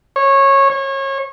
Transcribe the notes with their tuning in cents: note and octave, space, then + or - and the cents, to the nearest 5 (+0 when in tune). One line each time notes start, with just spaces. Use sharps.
C#5 -20
C#5 -30